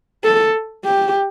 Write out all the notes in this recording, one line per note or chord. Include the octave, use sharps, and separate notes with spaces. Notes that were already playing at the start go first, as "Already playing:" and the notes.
A4
G4